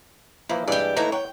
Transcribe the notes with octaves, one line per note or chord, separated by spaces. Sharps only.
E3 F3 A#3 E4
G2 E3 G#3 G4 D5
D#2 E3 A3 D#4 E4 A#5
C#5 F#5 G5